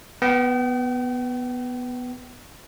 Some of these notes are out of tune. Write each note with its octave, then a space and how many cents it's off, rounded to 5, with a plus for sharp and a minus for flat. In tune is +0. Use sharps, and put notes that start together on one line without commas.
B3 +0 G5 -40